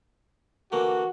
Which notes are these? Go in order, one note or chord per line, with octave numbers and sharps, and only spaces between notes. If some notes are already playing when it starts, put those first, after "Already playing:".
D3 E3 A#3 F#4